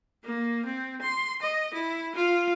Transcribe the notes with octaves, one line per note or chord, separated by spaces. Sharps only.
A#3
C4
C6
D#5
E4
F4